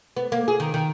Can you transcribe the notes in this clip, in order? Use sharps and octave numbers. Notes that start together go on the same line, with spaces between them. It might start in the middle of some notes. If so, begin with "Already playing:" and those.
B3
A#3
G#4
D#3
D#3